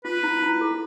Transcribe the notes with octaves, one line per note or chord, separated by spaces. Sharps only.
F4 B4
E4
E4
A4